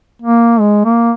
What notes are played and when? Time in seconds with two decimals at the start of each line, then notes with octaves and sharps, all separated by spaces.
0.22 A#3
0.60 G#3
0.85 A#3